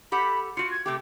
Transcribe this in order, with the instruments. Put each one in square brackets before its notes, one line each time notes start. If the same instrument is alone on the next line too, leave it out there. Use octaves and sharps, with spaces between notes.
[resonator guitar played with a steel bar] G4 A4 F#5 [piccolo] B5
[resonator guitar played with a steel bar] F4 F#4 [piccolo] C#7
[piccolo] G#6
[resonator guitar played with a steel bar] C3 A3 G4 [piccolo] D6